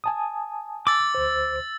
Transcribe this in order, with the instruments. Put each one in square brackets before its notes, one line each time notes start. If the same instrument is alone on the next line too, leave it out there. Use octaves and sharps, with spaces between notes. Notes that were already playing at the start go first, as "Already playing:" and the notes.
[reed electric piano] G#5 A5 D#6
[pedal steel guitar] D6 [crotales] E6 A6
[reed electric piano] D2 C5